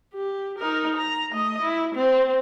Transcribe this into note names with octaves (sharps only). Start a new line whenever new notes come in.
G4
D#4 A#4
A#5
A3 D#5
E4
C4